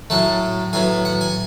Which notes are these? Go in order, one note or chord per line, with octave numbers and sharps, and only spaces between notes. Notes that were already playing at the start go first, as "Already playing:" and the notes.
A2 F#3 A3 A5
A2 F#3 B3 G#5
F#5
G#5